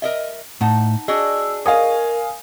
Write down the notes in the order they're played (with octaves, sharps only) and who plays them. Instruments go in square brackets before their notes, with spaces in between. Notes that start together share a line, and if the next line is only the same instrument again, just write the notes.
[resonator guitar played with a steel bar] A#4 D#5 E5
[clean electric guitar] A2 [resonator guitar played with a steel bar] D#4 F#5 A5
[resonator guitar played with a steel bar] D4 F#4 D#5 [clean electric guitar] G#4 [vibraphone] E6
[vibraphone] A#4 [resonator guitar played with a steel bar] C#5 D#5 [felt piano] F5 G#5 D#6